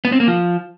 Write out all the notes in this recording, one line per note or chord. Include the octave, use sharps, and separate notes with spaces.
B3
C4
A#3
F3